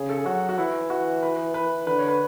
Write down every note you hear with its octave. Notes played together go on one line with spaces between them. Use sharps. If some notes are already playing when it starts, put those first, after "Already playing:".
Already playing: C#3 G#4
A4
G#4
F#3 F#4
F#4
E3 E4
F#4
B4
B4
D3 B4
C#5
B4